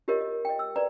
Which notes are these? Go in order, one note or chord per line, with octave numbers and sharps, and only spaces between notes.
F4 G4 A#4 C#5 D#5
D#5
D#5 G5
E6
B4 D5 A#5